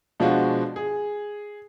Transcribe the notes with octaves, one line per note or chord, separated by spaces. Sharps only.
B2 F3 G#3 D4 F4 F#4
G#4